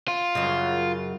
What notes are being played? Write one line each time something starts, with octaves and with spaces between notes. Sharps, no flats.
F4
F#2 C#3